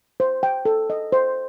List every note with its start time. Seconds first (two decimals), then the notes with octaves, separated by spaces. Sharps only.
0.20 C5
0.43 G5
0.65 A4
0.90 D#5
1.12 C5